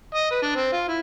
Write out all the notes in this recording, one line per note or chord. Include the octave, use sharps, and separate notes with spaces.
D#5
B4
D4
C4
F4
E4